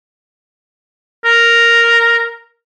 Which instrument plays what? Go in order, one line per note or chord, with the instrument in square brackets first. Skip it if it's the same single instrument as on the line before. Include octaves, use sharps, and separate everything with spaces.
[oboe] A#4